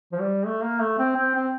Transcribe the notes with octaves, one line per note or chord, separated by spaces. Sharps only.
F3
G3
A3
A#3
A3
C4
C4
C4